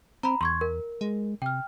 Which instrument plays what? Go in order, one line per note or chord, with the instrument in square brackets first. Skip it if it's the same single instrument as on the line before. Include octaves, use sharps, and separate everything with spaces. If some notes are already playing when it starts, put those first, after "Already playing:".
[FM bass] C4 [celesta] A#5 B5
[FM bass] E2 [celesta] C6 C#6 G#6
[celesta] A#4
[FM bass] G#3
[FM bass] C3 [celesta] G5 F6